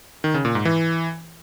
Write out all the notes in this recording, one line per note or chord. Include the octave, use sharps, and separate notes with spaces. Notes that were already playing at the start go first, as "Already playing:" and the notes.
D#3
C#3
A#2
G#2
E3